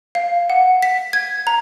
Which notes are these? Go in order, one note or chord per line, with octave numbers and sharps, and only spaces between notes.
F5
F#5
B6
G#6
A#5